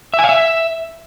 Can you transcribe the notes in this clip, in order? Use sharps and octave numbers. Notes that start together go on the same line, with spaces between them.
E5
G#5
F5
E5